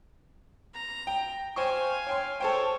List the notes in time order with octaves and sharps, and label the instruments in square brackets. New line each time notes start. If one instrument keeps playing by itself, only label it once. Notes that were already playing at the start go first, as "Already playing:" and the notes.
[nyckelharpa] A#5
[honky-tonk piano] G5
[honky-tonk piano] C5 G5 C#6 [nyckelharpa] F5 G#5
[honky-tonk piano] C#5 G5 C6
[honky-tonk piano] A4 C5 G5 [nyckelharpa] C#5